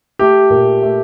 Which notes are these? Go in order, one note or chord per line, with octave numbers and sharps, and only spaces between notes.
A3 G4
A#2
A3